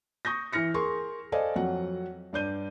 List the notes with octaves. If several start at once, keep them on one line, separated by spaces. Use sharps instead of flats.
C#6 D#6 G6 A#6
E3 E4 F6 A#6 C#7
G#4 A#4 C6 C#6
A4 C5 D5 D#5 F5 G#5
F2 F#3 F#5
G2 D5 G6 D#7